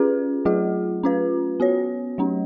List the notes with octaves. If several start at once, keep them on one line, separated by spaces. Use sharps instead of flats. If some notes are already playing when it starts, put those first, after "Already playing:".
Already playing: C#4 F4 G#4 B4
F#3 A3 F4 G#4
C#4 F4 B4
B3 F#4 C#5
F#3 A3 C#4